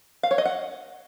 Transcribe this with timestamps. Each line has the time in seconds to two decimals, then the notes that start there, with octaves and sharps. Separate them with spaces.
0.23 F5
0.31 C#5
0.38 D#5
0.45 F#5